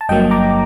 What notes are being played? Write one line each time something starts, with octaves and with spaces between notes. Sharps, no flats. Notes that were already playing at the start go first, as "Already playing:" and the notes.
A5
G1 G2 F#3 A#3 D#5 G5
A#5 D6